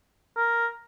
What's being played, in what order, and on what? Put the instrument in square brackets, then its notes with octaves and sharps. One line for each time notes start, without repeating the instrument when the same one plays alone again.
[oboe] A#4